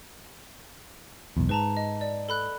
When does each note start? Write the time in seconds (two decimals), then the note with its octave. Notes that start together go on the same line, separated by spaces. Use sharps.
1.37 B1 E2
1.49 G#2 B4 A5 A#5
1.77 D#5
2.01 D5
2.29 A4 B5 F#6